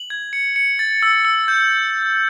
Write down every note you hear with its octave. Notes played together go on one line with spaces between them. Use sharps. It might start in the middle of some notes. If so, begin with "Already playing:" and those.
Already playing: F#7
G#6
C#7
C#7
A6
E6
E6
G6